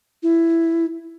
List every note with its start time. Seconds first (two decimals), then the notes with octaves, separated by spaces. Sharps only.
0.23 E4